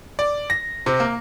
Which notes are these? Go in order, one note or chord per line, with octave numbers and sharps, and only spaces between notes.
D5
A#6
C3
A#3